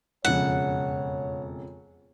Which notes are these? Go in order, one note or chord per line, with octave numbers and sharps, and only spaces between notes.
E1 F2 C#3 C#5 F#5